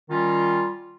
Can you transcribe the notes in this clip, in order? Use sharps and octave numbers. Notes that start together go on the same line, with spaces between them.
D#3 G3 C#4 F4